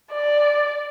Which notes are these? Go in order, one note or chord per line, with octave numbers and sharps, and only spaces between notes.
D5